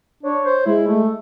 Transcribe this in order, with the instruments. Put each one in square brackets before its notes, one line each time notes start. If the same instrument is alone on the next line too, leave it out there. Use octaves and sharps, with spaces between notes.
[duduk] D4 [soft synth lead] C#5
[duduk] C5
[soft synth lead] G#3 [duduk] E4
[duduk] A3